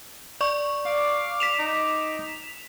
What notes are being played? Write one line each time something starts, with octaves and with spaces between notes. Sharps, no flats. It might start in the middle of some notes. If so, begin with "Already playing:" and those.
D5 C#6
F5 D6
B6 E7 F7
D#4